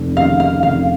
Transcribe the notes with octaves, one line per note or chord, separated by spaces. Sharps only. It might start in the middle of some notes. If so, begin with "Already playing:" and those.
Already playing: F1
D#2 C#3 F5
F5
F1 F5